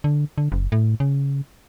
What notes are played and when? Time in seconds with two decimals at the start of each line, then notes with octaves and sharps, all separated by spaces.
0.04 D3
0.38 D3
0.52 F#1
0.72 A2
1.00 C#3